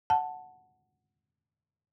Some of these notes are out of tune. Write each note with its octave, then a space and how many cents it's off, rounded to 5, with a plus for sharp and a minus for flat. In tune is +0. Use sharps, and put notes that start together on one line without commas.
F#5 +0 A5 +0